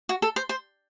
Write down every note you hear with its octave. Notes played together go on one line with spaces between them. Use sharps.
F#4
A4
C5
C5